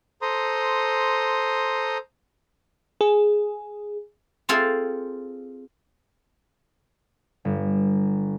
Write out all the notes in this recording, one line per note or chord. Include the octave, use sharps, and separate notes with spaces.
A4 C5 A#5 C6 D#6
G#4
C4 F4 G#4 A4 C5 F5
G1